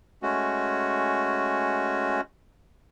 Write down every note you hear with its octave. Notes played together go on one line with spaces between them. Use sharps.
G#3 A3 C#4 F#4